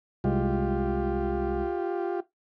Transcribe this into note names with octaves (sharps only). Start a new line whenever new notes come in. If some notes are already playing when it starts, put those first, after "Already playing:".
C2 G#3 F4 G4